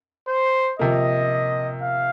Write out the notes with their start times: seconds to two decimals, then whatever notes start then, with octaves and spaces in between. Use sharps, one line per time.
0.28 C5
0.79 C3 F3 A#3 D#5
1.81 F5